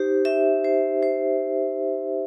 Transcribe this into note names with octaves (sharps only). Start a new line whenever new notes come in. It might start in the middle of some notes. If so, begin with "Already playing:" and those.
Already playing: D#4 G4 C5
E5
C5
C5